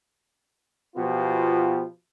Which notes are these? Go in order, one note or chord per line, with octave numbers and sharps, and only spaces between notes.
B2 F3 B3 F4 G4